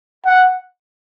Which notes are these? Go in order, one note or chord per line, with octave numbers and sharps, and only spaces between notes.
F#5